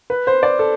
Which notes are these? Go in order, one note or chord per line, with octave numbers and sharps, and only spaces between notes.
B4
C5
D5
A4